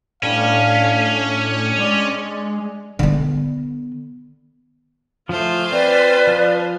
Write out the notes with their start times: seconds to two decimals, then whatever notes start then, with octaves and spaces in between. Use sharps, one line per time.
0.23 A2 G3 C#4 D4 F5
1.78 G#3 D5
2.99 D3 B3
5.29 F3 A3 F4 C5 G#5
5.72 C4 B4 D5
6.27 F3